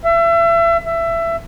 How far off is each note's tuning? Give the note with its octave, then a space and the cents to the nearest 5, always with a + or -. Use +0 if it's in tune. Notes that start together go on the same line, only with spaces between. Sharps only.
E5 +35
E5 +20